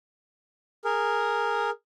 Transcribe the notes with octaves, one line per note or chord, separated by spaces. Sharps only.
G#4 A#4